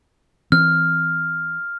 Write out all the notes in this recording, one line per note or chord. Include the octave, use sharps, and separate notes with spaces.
E3 C4 F6